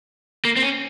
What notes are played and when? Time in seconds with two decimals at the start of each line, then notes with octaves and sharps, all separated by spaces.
0.45 A#3
0.56 C4
0.63 C#4